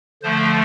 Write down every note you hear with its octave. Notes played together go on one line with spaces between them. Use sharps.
D3 F3 A3 C5